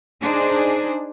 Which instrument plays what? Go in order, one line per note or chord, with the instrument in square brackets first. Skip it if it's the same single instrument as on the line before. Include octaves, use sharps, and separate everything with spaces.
[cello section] D4 D#4 G#4 C5